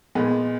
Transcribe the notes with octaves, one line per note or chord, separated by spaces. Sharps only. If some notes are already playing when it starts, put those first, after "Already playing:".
A#2 G#3 B3